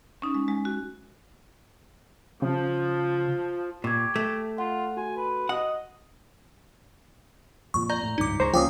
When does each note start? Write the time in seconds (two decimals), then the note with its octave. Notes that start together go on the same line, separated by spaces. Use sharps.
0.22 C#4 D#4
0.34 G#3
0.48 G#3
0.65 F#4
2.42 C#3 F3
3.84 A#2 G4 C#6 D6 G#6
4.16 A3
4.58 F4 F#5
4.97 F#4 G#5 C6
5.16 B4
5.49 D#5 F#5
7.74 F2 A#2 F3 C#6
7.90 D5 A#5 G6
8.03 A2
8.18 G#1 C#2 G2 D#4 D6
8.40 C#2 G#3 C5 A#5 C#6
8.54 C#2 F3 A#3 C#4 G5 D6 D#6